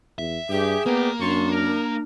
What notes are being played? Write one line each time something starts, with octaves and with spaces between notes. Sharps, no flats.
E2 E5
G2 G4 G#4
A#3 B3 D4 D#4 G4
F#2 D4 A5 C6 C#6
A#4